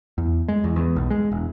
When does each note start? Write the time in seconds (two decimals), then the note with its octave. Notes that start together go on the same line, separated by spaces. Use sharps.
0.18 E2
0.48 G#3
0.64 E2
0.76 E2
0.96 B1
1.10 G#3
1.32 E1